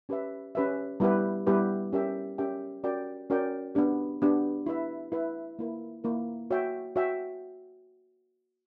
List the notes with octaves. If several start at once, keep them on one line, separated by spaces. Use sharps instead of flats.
C#4 G4 B4 E5
C#4 G4 B4 E5
G3 B3 E4 G4 B4
G3 B3 E4 G4 B4
C#4 G4 A#4 E5 G5
C#4 G4 A#4 E5 G5
C#4 F#4 A#4 D5 G5
C#4 F#4 A#4 D5 G5
B3 D4 G4
B3 D4 G4
E4 B4 E5
E4 B4 E5
A#3 E4 A#4
A#3 E4 A#4
F#4 C#5 E5 G5
F#4 C#5 E5 G5